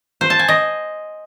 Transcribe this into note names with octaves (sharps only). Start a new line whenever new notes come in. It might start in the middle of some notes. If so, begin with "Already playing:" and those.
C5
A5
G#5
D#5